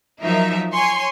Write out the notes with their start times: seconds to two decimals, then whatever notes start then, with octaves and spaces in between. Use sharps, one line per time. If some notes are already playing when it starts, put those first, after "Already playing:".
0.21 F3 F#3 D#4 A#4 E5
0.73 C#5 G#5 C6 C#6